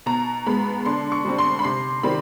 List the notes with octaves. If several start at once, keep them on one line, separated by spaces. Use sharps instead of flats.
B2 A#5
G#3 B3 B5
D3 C6
C#6
G3 C4
C6
B5
C3 C6
D#3 G3 C4 B5